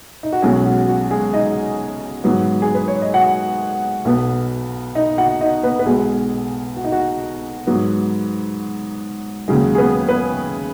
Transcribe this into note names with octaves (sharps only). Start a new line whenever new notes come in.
D#4
F#4
B1 B2 F#3 G#3 C#4 G#4
F#4
F#4
G#3 G#4
D#4 D#5
G#2 F#3 B3
G#4
B4
C#5
D#5
F#4 F#5
B1 B2 B3
D#4 D#5
F#4 F#5
D#4 D#5
B3 B4
B4
B1 B2 G#3 G#4
F#4
D#4
F#4
G#2 F#3 B3
D#2 C#3 F#3 G#3 G#4
G#4
B3 B4
B3 B4